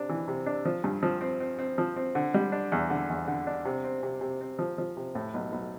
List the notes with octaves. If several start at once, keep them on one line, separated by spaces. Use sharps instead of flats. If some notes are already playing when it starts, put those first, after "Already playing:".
Already playing: C3 D4
E3
C3
D4
F3
G2
F3
C4
C4
C4
F3
C4
D3
G3
D4
E2
D3
E2
D3
D4
C3
C4
C3
C3
C4
F3
F3
C3
A2
B1
B1